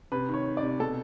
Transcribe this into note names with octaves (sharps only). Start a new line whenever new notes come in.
C3 B4
D#3 C#5
D#3
D5
C3
B2 A4